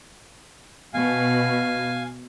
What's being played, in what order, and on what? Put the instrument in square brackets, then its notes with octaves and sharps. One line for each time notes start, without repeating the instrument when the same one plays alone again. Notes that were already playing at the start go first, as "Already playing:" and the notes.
[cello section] B2 [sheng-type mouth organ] F5 G#5